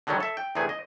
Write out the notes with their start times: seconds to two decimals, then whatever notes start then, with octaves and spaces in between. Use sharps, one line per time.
0.07 D3 D#3 F#3 G3 C#4
0.20 A4 E5
0.37 G5
0.55 E2 C3 A3 B3 G#4
0.69 D#5